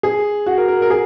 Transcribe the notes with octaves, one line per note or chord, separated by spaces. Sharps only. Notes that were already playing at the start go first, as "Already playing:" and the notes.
G#4
F#4
A#4
A#4
A#4
G#4